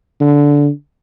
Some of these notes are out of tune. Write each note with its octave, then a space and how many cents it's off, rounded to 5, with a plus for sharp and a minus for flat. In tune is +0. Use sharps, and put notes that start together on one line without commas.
D3 -15